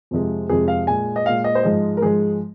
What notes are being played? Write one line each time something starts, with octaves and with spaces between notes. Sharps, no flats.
F2 C3 F3 G#3
F2 C3 F3 G#3 G#4
F5
A#2 G#3 G#5
D#5
A#2 G#3 F5
D#5
C5
G#2 F3 G#3 D#5
A#4
G#2 F3 G#3 G#4